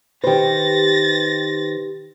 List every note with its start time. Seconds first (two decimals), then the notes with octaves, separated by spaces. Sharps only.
0.24 D#3 G4 B4 C5 A6 A#6